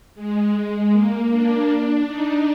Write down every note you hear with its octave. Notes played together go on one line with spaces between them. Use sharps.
G#3
G#3
A#3
D4
D#4